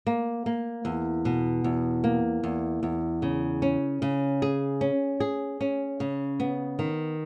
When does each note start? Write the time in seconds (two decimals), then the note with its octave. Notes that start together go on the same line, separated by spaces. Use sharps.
0.07 A#3
0.46 A#3
0.85 E2
1.25 B2
1.64 E2
2.04 A#3
2.43 E2
2.83 E2
3.22 C#3
3.62 C#4
4.02 C#3
4.42 G#4
4.81 C#4
5.20 G#4
5.61 C#4
6.00 C#3
6.40 B3
6.79 D#3